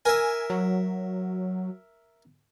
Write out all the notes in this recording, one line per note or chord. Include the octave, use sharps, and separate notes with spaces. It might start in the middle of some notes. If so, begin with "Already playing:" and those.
A#4 E5 G#5
F#3